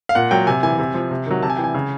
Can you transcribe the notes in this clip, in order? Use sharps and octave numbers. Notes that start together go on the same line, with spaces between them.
F5
A#2 F#5
F#3 G5
C3 G#5
E3 G#5
C3
F3
C3
D#3 F#3
C3 A5
G#5
E3 G5
G#5
C#3